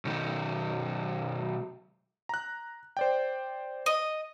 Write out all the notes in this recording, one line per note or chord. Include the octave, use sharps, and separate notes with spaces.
B1 D#3
A#5 F#6
C5 D5 G5
D#5